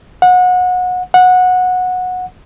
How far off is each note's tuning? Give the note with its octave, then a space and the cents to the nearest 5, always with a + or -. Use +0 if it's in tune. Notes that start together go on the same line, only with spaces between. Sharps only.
F#5 -25
F#5 -15